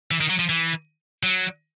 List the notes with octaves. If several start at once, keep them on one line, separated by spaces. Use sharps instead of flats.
E3
D#3
F#3
F3
E3
F#3